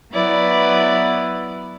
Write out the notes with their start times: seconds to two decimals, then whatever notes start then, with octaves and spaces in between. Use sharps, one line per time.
0.12 F#3 B3 E4 B4 D5